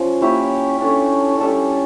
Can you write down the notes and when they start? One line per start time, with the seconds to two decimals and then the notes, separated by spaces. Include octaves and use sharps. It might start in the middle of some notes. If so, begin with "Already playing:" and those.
Already playing: F3 C#4
0.21 A#3 E4 G4 C#5
0.80 C#4 D4 A4 C#5
1.39 G3 C#4 D4 A4 D5